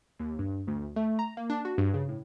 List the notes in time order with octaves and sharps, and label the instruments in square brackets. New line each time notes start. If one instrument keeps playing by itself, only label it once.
[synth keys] D#2
G2
D2
A3
A#5
A#3
D4
F#4
G2
C#3
A2